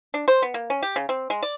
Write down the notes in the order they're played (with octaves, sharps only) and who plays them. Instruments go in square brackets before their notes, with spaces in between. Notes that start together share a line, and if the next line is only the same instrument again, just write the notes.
[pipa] D4
C5
B3
A#3
C#4
G4
C#3
C4
G#3
D5